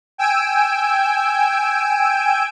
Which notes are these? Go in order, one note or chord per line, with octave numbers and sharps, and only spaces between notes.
G5 G#5 E6 D7